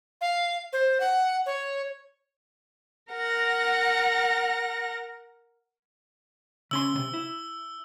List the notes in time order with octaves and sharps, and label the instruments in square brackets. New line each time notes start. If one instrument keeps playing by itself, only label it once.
[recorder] F5
C5
F#5
C#5
[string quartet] A#4 F#5 A#6
[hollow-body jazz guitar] C#3 C#4 C6 [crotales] E6 G7
[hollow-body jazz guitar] D2 C3
E4